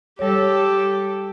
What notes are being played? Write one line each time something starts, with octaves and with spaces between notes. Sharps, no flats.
G3 G4 A4 C#5